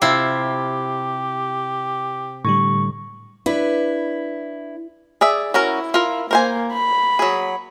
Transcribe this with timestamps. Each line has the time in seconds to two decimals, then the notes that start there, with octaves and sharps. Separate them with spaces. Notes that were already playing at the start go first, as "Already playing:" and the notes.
0.02 C3 E4 F4 G4
2.45 A2 D3 G3 C#6
3.46 D4 E4 B4
5.21 G#4 D5 E5
5.54 C#4 E4 F#4 A#4
5.94 F4 A#4
6.31 A#3 A#4 C5 G#5
6.73 B5
7.19 F#3 G#4